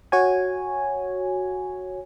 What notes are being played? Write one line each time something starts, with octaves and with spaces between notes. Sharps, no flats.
F#4 C#5 G#5